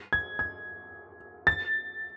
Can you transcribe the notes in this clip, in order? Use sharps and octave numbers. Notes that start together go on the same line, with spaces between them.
G#6
G#6
A6